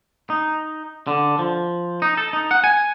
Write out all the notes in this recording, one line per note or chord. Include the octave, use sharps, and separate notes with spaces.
D#4
D3
F3
D#4
A4
D#4
F#5
G#5